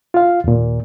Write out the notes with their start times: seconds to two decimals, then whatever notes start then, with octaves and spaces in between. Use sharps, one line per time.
0.14 F4 F5
0.44 D#2 A#2